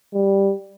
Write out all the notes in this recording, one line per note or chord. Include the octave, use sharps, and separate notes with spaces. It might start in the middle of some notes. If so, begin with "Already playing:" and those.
G3